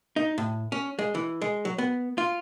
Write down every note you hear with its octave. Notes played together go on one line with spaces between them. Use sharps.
D#4
A2
C#4
G#3
E3
G#3
F#3
B3
F4